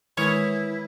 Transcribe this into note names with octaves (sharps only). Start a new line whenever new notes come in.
D#3 E3 G#3 E4 G#4 A#4 C#5 F6